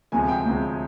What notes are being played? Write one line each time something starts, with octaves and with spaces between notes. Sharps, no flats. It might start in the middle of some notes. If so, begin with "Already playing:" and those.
D2 C3 F3 G#3 G#5
G5
D2 C3 F3 G#3